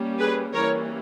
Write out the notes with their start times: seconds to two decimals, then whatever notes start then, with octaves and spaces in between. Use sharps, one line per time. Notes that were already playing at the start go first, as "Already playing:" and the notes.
Already playing: G3 A#3 C#4
0.18 G#4 B4
0.53 E3 G3 A#3 C#4 A#4 C#5